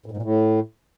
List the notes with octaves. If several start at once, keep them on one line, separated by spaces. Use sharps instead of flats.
A2
G#2
A#2
A2